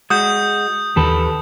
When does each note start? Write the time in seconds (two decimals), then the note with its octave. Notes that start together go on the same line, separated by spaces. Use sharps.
0.10 G#3 F#4 D#6 G6
0.96 D#2 D#3 E3 G4 A4 B4